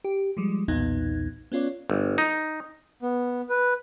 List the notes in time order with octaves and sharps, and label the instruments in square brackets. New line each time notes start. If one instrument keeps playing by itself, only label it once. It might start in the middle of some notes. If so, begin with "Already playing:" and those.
[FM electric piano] G4
F3 G3 G#3
B1 E2 A#2 B3 D#4 G#6
B3 C#4 F4 C#5 D5
[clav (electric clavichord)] G1
D#4
[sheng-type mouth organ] B3
B4